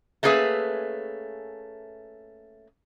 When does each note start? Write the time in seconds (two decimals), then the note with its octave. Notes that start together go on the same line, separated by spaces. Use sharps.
0.23 A3 A#3 C#4 G#4 B4 E5